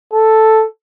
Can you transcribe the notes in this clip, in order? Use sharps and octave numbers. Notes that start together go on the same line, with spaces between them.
A4